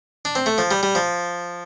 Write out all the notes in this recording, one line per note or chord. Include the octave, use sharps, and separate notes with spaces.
D4
C4
A3
F3
G3
G3
F3